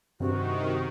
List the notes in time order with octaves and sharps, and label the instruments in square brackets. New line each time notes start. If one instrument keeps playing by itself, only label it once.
[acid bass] G2 [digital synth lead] C3 [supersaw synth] D#3 [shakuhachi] F#4